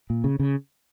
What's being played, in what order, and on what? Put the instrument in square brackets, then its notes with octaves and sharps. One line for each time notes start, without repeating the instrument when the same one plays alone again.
[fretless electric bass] A#2
C#3
C#3